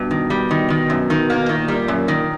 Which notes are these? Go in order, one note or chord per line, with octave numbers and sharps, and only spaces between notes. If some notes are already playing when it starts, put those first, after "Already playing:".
Already playing: G2 B2
D#3
G3
D#3
D#3
F#2
D#3
A#3
A#2 D#3
G3
F#2
D#3